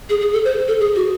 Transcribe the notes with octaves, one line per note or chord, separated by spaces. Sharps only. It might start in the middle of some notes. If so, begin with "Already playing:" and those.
G#4
G#4
A4
C5
A4
G#4
F#4